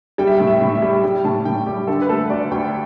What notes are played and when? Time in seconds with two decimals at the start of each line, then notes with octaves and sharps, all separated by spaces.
0.18 G3 G5
0.27 E5
0.36 A2 G5
0.47 E5
0.61 A2
0.75 E5
0.82 G3
1.03 G3 G5
1.25 A2 A5
1.45 A2 G5
1.66 G3 G4
1.87 D3 A4
2.02 B4
2.09 A3 A4
2.30 D2 D5
2.51 D2 G5